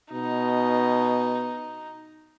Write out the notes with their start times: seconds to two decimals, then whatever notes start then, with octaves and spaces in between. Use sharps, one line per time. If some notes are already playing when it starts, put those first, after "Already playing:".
0.13 B2 D#4